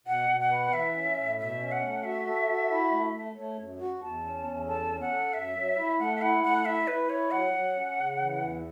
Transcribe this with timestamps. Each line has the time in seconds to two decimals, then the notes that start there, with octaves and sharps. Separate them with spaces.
0.07 B2 F#5
0.29 B2
0.40 F#5
0.50 B4
0.72 E3 E5
0.95 C#4
1.17 A2
1.39 B2 E5
1.60 C#4
1.72 F#5
1.83 A3
2.04 F#4 E5
2.27 A4
2.48 F#4
2.70 E4
2.92 A3
3.14 A3
3.36 A3 C#5
3.59 F#2
3.80 F#4
4.02 E2 A5
4.24 C#4
4.47 E2
4.68 A4 A5
4.91 C#4
5.01 F#5
5.12 A4
5.34 F#2 E5
5.55 F#3
5.78 E4
6.00 A3 F#5
6.16 E5
6.22 E4 F#5
6.44 A3 F#5
6.65 E4 E5
6.88 E4 B4
7.10 E4 C#5
7.31 F#3 F#5
7.53 F#3
7.76 C#4
7.98 C#3
8.19 E3
8.41 E2